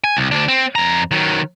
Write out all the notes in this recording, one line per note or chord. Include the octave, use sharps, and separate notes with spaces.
G#5
C2
D2 D4
C4
F2 A#5
D#3 F#3